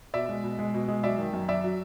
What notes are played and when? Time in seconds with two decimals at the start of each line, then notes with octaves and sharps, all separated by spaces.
0.14 B2 D5 E5
0.29 G#3
0.43 B2
0.59 G#3
0.74 B2
0.88 G#3
1.03 F#3 D5 E5
1.18 D#3
1.33 F#2
1.48 F#2 D5 E5
1.64 F#3